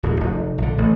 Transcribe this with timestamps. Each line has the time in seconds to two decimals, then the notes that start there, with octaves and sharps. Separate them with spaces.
0.03 D1 F#2
0.21 F1
0.58 A#1 D3
0.78 A1 A3